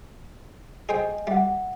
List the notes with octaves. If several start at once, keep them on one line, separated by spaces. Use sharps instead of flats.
G#4 C5 D#5 G5 G#5
G3 E5 F#5